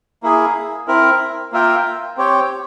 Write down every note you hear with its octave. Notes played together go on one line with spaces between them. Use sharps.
A#3 E4 G#4
C4 E4 A#4
A#3 F4 A#4 E5 G5
C4 G4 C#5 G5